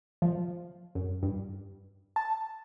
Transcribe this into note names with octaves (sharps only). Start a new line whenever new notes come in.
F3
F#2
G2
A5